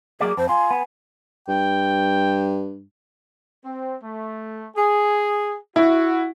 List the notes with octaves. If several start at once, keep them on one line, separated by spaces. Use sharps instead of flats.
F#3 A#3 G#4 D5
F2 C5
F4 G#5
B3
G2 G5
C4
A3
G#4
E4 F#4